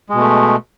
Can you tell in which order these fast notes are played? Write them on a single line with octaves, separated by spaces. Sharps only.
G#3 B2 A3